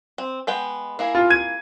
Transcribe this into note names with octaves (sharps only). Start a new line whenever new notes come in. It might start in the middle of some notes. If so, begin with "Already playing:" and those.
C4
G#3 B3 G5
A#3 E4 G#4
F4
G#6 D#7